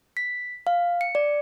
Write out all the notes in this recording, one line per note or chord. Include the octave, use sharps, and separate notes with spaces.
B6
F5
C#7
D5